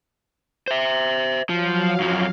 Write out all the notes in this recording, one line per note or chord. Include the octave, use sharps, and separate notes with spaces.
C5 E5
F3 F#3 F5
F#2 F3